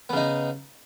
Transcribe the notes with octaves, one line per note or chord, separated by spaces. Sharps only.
C#3 B3 D#4